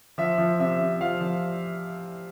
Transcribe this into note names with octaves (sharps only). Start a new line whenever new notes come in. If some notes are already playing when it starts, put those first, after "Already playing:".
F3 E5
F3
C3 E5
C3
F3 F5
F3